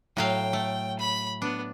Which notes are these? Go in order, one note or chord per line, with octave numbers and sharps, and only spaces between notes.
A2 F#3 F5 G5
A3
B5
B3 D4